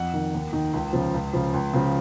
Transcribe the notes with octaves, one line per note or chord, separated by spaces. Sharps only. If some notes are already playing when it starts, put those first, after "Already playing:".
Already playing: F2 F#5
D#3
D#2
D#3
C#2
C#3 F3
C#2
C#3 F3
C#2
C#3 F3